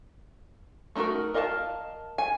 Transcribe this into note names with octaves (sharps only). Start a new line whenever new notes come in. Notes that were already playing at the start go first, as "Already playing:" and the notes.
A3 D#4 E4 F#4 A#4
A#4 D#5 F5 G5 A5
G#5